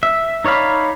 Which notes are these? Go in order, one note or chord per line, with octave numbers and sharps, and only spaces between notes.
E5
D#4 C#5 D5 F5 B5